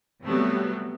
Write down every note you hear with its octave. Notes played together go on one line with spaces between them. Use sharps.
C3 F#3 G3 A3 B3